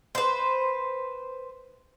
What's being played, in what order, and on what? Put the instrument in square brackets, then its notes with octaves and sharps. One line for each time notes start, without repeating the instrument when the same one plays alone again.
[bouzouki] B4 C5